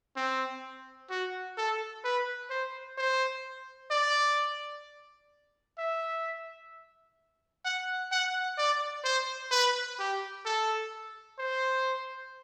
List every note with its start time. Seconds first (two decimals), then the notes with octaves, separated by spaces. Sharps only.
0.16 C4
1.10 F#4
1.57 A4
2.04 B4
2.50 C5
2.98 C5
3.91 D5
5.78 E5
7.65 F#5
8.12 F#5
8.58 D5
9.04 C5
9.51 B4
9.99 G4
10.45 A4
11.38 C5